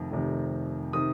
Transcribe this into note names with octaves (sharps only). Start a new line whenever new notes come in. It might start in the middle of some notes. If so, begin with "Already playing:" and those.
Already playing: F1 F2 C3 D#3
F1 F2 C3 D#3
C3 D#3 D#6